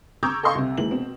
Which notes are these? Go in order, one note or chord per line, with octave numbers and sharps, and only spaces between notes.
A#5 C#6 D6 E6 G6 G#6
A4 D#5 F5 C6 C#6
C2 C3
D#2 E3 G#3 F#7
B2 C4